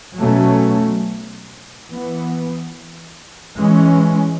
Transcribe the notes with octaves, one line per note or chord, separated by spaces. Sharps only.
B2 F#3 A3 C#4
E3 B3
E3 G#3 C#4